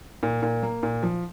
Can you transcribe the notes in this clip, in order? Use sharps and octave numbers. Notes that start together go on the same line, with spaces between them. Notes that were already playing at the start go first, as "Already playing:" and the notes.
A#2
A#2
A#3
A#2
F3